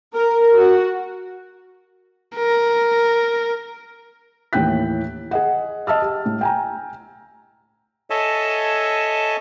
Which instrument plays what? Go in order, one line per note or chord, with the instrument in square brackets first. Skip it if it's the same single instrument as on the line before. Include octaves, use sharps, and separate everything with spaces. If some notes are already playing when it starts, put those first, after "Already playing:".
[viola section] A#4
F#4
[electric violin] A#4
[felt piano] D#2 A2 E3 G5 F#6 B6
G#4 D#5 F#5
D#5 A5 E6 F6
G4
A2
G5 G#5 A#5
[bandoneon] A4 C#5 D#5 E5 G#5 A5